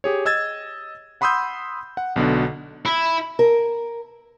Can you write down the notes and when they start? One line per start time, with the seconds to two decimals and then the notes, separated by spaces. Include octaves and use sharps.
0.04 G4 G#4 C#5
0.25 D#5 E6 G#6 A6
1.21 F#5 B5 C6 D#6 E6 G6
1.97 F#5
2.16 B1 B2 D3
2.86 E4
3.39 A#4